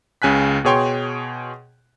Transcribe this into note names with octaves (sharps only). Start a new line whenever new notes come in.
C#2 C#3 G#5 F#6 B6
B2 G#4 C#5 G5 C6